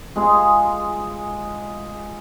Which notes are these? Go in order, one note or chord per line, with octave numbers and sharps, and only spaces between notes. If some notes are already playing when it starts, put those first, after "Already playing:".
G#3 F4 G#4